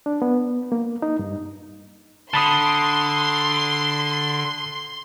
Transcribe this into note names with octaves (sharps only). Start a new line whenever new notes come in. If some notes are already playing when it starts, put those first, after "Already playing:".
D4
B3
A#3
D#4
G2
D3 A5 B5 C6 D#6